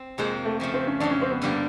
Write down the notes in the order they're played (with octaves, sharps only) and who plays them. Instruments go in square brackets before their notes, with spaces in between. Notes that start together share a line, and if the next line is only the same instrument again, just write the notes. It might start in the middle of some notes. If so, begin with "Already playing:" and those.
Already playing: [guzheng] C4
[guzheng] F2 C3 F3 A#3 [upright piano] G#3
[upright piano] A3
[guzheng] C#3 F3 A3
[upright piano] C4
C#4
[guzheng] F2 C#3 F3 [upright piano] D4
[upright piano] C#4
C4
B3
[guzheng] G2 D3 G3 A#3